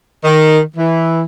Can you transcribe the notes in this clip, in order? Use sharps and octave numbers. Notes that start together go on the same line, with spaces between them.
D#3
E3